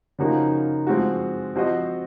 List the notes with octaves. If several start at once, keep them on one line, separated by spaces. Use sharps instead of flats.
C#3 F3 A#3 D#4 F#4
F3 G#3 C4 F#4
F3 C4 F#4 C5 D#5